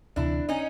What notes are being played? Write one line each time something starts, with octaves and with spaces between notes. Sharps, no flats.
D2 C3 E3 D4 E4
C#4 D#4